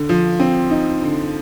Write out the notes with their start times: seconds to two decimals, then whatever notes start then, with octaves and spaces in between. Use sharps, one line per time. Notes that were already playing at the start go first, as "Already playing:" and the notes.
Already playing: D3
0.09 F3
0.40 C4
0.70 D#4
1.02 D3